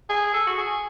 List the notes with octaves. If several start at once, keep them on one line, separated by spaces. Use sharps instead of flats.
G#4
A4
F#4
G#4